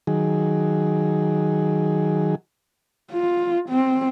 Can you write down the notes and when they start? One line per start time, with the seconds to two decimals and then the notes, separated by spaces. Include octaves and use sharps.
0.07 D#3 F#3 G#4
3.12 F4
3.69 C4